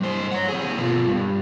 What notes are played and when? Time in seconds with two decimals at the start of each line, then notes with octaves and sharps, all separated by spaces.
0.01 G2 C5
0.32 C#5 F#5
0.48 D#2 G#4
0.80 B2 F4
1.07 G2